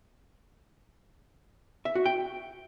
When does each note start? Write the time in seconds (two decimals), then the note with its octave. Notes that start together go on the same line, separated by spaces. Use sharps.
1.85 E5
1.95 F#4
2.06 G5